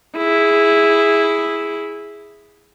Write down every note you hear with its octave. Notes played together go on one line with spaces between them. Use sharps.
E4 G#4